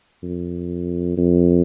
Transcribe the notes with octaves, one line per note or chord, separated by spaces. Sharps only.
F2
F2